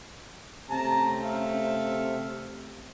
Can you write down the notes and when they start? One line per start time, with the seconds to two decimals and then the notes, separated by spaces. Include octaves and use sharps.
0.70 C3 A3 C4 C#4 A5 A#5
1.23 A4 E5 F5